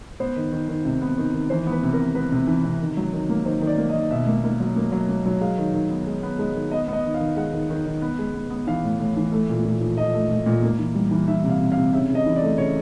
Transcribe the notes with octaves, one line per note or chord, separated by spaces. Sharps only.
B3 C5
D#3
D#3
D#3
C3
B3
D#3
D#3
E3 C5
B3
B4
C3
A#4
B3
B3 B4
C3
E3
C3
D#3
F#3
D#3
A#3
D#3 C5
D#3
D5
A#3
D#5
D#3
B2 E5
A#3
A#3
F#3
A#3
F#3
A#3
F#3
G#3 F5
D#3
D#3
B3
G#3
B3
G#3
D#3
B3 D#5
B3 D#5
D#3
F5
D#3
G#3 F#5
D#3
D#3
D#3
B3
G#3
B3
B3
E3 F5
A2
A2
E3
A3
A#2
A#2
F3
F3 D#5
A3
A#2
A#2
A#3
E3
G3
E3
E3 E5
C3
F5
C3
F5
C3
C#3 E5
C#3
D#5
E3
D5
A3
C#3 C#5